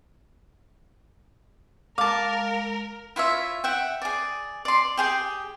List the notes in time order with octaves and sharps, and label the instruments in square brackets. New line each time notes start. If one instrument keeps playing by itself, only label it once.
[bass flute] G#3 [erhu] A#4 [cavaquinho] F5 A5 [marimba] D6
[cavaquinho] E4 F4 C#5 E5
E5 F#5 G5
G#4 D5
D5 C6
G4 G#4 G5